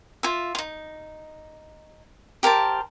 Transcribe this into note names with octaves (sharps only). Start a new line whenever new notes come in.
F4 E5
D#4 F4
G4 A#4 C5 A5